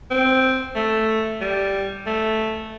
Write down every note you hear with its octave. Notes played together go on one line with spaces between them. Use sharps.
C4
A3
G3
A3